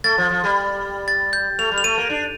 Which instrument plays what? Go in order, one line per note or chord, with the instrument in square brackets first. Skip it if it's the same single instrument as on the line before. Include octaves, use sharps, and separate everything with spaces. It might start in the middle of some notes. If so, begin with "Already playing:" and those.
[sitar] A3 [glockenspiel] A6
[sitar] F3
F3
G3
[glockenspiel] A6
G6
[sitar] A3 [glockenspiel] F7
[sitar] G3
[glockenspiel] F7
[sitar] A3 [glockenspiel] D#7
[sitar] A#3
D4